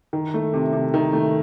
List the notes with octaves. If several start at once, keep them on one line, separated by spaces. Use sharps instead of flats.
D#3
A3
C3
C3
D#3
A3